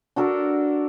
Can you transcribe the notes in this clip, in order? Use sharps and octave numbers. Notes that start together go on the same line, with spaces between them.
D4 F#4 A4 A#4